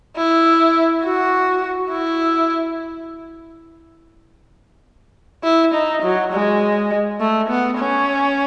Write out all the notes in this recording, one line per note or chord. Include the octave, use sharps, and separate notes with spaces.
E4
F#4
E4
E4
D#4
F#3
G#3
A3
B3
C#4